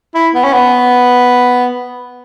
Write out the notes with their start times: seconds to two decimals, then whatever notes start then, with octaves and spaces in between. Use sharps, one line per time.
0.15 E4
0.35 B3
0.44 C#4
0.53 B3